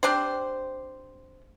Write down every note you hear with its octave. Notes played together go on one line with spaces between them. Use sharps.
C4 D4 G4 C5